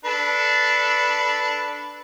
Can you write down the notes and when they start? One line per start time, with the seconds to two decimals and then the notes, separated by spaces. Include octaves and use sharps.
0.05 D4 A4 B4